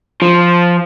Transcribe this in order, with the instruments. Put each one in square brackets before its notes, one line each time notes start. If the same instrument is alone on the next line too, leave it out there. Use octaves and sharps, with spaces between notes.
[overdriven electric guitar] F3